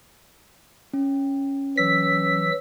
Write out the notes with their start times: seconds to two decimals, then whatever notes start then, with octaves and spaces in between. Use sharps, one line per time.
0.94 C#4
1.77 E3 F#3 E6 B6